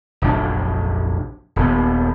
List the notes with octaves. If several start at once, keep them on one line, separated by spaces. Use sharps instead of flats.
F1 A#1 F#3 D4
D#1 D#2 B3